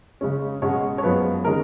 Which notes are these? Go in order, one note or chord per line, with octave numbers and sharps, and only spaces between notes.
C#3 G#3 C#4
B2 G#3 C#4 C#5
C#5
F#2 F3 G#3 B3 B4
D#3 G#3 C#4 A#4